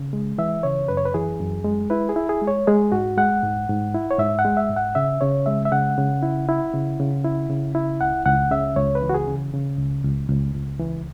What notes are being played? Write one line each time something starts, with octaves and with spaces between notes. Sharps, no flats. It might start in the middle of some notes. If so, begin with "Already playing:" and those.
Already playing: C#3
G#3
E3 E5
C#3 C#5
F#2 B4
C#5
B4
E3 G#4
F#2
G#3
E4 B4
G#4
E4
G#4
G#3
C#5
G#3 G#4
G#2 F#4
G#3 F#5
G#2
G#2
E4
C#5
G#2 E5
F#5
G#3
E5
G#2
F#5
C#3 E5
C#3 C#5
G#3 E5
E5
C#3 F#5
C#3
E4
E4
C#3
C#3
E4
C#3
E4
C#2 F#5
C#2 F#5
C#3 E5
C#2 C#5
B4
E3
F#4
G#4
C#3
C#3
C#2
C#2
C#2
C#2
E3